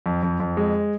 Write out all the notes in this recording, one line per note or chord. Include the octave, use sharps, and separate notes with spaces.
F2
F2
F2
G#3